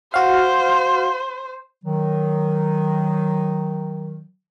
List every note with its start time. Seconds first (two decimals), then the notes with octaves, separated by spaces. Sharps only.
0.14 F#4 C5 F5
1.84 D#3 F#3